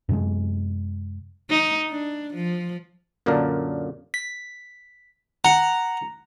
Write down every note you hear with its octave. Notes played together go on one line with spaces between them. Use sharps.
F#2 C3 G#3
D#4
D4
F3
F#2 A#2 D3 A#3 D4 A#4
B6
F#5 A#5